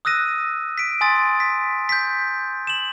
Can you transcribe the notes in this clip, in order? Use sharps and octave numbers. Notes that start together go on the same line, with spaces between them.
D#6 E6 F#6 A#6 D#7
B6 D7
G#5 C6 D#6 A6
B6
G6 B6
E7 F#7